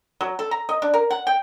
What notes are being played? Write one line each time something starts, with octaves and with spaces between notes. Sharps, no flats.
F#3
A4
A#5
D#5
D4
A#4
F#5
G5